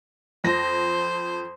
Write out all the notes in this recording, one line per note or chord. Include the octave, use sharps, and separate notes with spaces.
F2 C5 A#6